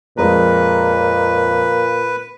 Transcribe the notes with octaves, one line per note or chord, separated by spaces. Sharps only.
F2 A#2 G#3 B4 A#5